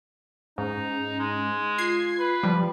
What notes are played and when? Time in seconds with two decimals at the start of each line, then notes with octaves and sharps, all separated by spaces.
0.58 G#2 C#4 D#4
1.19 G#3
1.78 F4 G#6 C7
2.19 B4
2.43 F3 G3